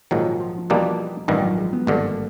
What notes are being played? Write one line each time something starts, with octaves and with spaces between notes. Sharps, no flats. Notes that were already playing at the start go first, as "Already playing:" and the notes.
A#1 G#2 D#3 F3 F#3
F3
E2 B2 G3 A#3 D4
A1 G2 D#3 F3 G3
F#3
G#3
B3
G#1 G2 D3 A#3